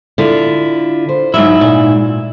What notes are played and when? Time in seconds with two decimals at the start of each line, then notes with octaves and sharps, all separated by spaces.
0.18 D3 E4 F4
1.09 C5
1.34 G#2 F#3 E4
1.61 A#2